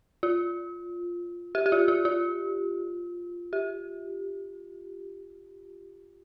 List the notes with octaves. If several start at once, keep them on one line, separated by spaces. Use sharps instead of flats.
F4
G4
G4
F4
F4
F4
G4